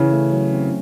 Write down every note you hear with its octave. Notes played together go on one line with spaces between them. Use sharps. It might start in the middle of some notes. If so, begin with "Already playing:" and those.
Already playing: C#3 E3 C#4
A3
F#3
C4